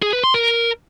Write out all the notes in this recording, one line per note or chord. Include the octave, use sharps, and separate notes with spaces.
G#4
B4
C6
A#4